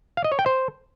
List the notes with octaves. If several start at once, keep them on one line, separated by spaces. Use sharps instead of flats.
F5
D#5
C#5
G5
C5